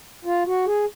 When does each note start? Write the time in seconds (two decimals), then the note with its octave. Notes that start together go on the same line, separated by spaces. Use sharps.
0.25 F4
0.47 F#4
0.66 G#4